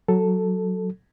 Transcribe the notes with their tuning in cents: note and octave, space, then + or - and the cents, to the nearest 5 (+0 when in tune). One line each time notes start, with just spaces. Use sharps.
F#3 +0 A4 +0